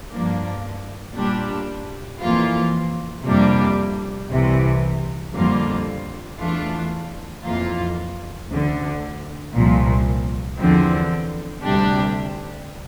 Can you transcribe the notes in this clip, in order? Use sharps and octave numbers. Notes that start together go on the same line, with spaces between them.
G2 F3 A#3 D4
A#2 G3 D4 G4
F2 E3 A#3 F4
F2 C3 G3 A#3 D4
C2 C3 E3
F2 D3 G3 A#3 F4
E2 E3 A3 D4 F4
F2 E3 A#3 F4
D2 D3 A3
C2 A#2 F3
E2 D3 F3 C4
D2 C3 G3 D4 G4